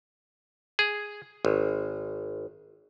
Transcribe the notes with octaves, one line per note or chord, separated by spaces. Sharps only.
G#4
G#1